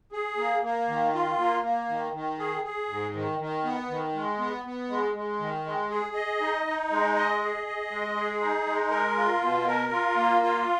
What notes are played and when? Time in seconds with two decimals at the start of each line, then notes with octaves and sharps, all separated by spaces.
0.12 G#4
0.37 A#3
0.63 A#3
0.88 D#3
1.13 F4
1.38 A#3
1.63 A#3
1.89 D#3
2.13 D#3
2.38 G#4
2.64 G#4
2.89 G#2
3.14 D#3
3.39 D#3
3.64 B3
3.89 D#3
4.15 G#3
4.39 B3
4.65 B3
4.90 G#3
5.15 G#3
5.39 D#3
5.65 G#3
5.90 G#4
6.15 D#5
6.40 D#4
6.66 D#4
6.91 G#3
7.16 D#5
7.40 G#4
7.66 D#5
7.90 G#3
8.16 G#4
8.41 D#4
8.66 G#3
8.91 A#4
9.17 F4
9.41 B2
9.66 A#4
9.92 F4
10.16 A#3
10.42 F4